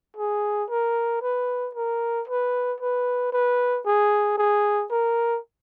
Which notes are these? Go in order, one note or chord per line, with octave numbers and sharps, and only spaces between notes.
G#4
A#4
B4
A#4
B4
B4
B4
G#4
G#4
A#4